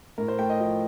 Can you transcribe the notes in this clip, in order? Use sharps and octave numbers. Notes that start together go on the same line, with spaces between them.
A2 A#4
C5
A3 G5
D#5
F3 D#5